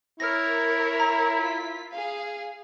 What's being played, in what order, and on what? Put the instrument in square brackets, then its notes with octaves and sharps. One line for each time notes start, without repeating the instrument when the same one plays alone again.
[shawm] E4 [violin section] A#4 C#5 [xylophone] F6 A#6
[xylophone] A#5
[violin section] F4 B6
G#4 F5